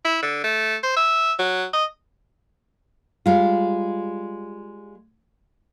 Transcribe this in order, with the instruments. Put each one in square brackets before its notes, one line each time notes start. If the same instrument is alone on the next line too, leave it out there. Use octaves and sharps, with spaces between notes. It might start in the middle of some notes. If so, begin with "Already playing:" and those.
[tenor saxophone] E4
D3
A3
C5
E5
F#3
D#5
[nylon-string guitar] G3 G#3 F4